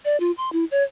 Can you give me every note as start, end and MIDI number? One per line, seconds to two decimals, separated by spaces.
0.05 0.19 74
0.20 0.32 65
0.37 0.52 84
0.52 0.65 64
0.71 0.83 73